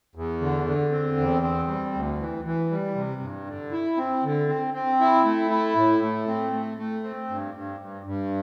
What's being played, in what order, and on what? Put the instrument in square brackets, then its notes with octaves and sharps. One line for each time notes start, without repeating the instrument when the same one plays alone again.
[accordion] E2
D3
D3
C4
E2
C4
G3
D2
E3
E3
G3
C3
G2
D3
E4
C4
D3
C4
C4
E4
A3
E4
A2
A3
C4
A3
A3
C4
G2
G2
G2
G2